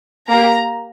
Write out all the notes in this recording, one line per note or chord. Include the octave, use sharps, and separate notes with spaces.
A#3 G4 A#5